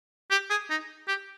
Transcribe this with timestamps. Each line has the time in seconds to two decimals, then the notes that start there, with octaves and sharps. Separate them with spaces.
0.31 G4
0.50 G#4
0.70 D#4
1.08 G4